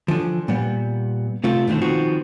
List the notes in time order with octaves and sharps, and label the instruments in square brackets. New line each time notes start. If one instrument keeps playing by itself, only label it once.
[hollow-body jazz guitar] D3 E3 F3
A#2 G3 B3
C3 A3 C4 F4 C5
B2 D3 D#3 A3 C4
D#3 F3 B3 C4 F#4